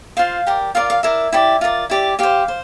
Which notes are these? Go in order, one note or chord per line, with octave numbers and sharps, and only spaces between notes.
F4 C5 F5
G4 A#4 D5
F4 A#4 D5 F5
F5
E4 A#4 D5 E5
E4 G4 D5
F4 A#4 D5
E4 G4 D5
G4 C5 F5
C5